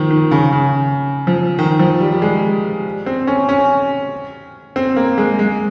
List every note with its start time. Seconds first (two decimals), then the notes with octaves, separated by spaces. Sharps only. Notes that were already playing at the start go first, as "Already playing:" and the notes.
Already playing: D#3 F3
0.11 D#3
0.31 C#3
0.52 C#3
1.27 F3
1.59 D#3
1.79 F3
2.01 G3
2.12 G3
2.22 G#3
3.06 C4
3.27 C#4
3.49 C#4
4.76 C4
4.96 A#3
5.18 G#3
5.39 G#3